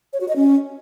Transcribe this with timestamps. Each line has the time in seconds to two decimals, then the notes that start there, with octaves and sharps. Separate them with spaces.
0.13 C#5
0.21 F#4
0.28 D#5
0.36 C#4